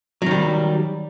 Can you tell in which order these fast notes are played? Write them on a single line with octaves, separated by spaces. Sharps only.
F#3 D#3 G3